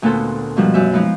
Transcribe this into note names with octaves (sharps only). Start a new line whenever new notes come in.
D2 A#2 B3 G#4 A4 C5
G#2 B2 F3 G3
F#2 E5
F3 G#3 B3 D#4 F4